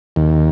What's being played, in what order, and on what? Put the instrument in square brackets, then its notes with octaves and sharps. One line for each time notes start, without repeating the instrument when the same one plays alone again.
[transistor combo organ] D#2